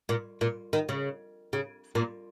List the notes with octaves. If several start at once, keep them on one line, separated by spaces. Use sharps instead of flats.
A#2
A#2
D#3
C#3
C#3
A#2